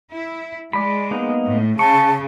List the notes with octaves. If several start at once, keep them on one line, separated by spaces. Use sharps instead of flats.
E4
G#3 D5 B5
A#3 B3 D#4
A2
C#3 A5 C#6